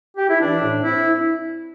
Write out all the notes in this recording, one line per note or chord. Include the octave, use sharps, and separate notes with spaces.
G4
E4
E3 D4
A2
C4 E4